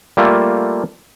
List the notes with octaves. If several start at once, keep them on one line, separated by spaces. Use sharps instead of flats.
G3 A3 A#3 F4 A4